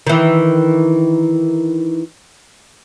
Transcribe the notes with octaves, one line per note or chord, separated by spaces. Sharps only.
D#3 E3